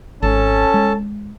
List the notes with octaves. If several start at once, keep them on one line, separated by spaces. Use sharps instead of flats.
G#1 C#4 A4 A5
G#3